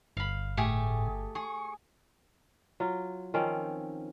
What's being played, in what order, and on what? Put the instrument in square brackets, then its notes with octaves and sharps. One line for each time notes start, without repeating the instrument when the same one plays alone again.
[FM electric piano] G1 [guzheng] F5 B5
[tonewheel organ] A2 [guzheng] A3 G4 G#4
[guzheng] G#4 [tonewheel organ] C#6
[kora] F#3 F4
D#3 F3 C4 C#4